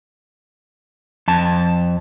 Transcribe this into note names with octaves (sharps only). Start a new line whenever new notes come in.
F2 A5